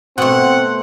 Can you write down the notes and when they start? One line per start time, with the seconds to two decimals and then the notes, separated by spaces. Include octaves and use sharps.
0.18 B2 A3 C4 F#5